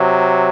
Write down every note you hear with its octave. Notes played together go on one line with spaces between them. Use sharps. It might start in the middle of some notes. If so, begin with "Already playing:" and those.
Already playing: C3 F#3